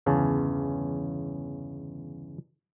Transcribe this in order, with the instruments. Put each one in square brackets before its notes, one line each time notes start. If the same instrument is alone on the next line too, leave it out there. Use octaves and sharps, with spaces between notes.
[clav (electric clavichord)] G1 E2 C#3 C#4 A5